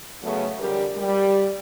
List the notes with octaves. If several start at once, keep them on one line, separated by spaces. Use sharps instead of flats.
C#3 F#3 A3 B3 C#4
F2 D3 G3 G4 A#4
G3